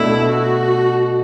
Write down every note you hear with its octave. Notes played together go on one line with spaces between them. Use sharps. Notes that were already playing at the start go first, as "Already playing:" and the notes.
Already playing: B2 A3 D4 E4
F#4